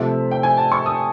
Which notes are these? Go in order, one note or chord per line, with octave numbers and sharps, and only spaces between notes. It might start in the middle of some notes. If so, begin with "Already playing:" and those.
Already playing: C3 F3 A3 C4 E5
G5
G#5
A5
C#6
D#6